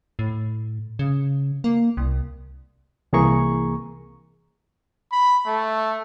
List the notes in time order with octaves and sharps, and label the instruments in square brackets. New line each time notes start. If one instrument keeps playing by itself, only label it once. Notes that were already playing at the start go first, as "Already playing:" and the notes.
[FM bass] A2
C#3
A#3
C2
[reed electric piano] C2 E3 A#3 G#4 A#5 C#6
[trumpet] B5
A3